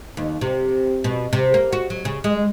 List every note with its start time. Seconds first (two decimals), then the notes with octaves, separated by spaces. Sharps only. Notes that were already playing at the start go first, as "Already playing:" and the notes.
0.17 D#2
0.41 C3
1.04 B2
1.33 C3
1.54 A#3
1.73 F#4
1.90 F#3
2.05 C#3
2.24 G#3